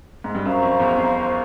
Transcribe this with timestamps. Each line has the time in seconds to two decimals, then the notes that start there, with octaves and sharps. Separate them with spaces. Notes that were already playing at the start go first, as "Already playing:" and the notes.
0.24 G#2
0.35 G2
0.45 F#2 C5 F5 A#5 C#6
0.63 F2
0.80 E2
0.97 F2